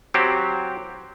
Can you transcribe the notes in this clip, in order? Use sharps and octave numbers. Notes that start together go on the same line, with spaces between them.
F#3 C4 G4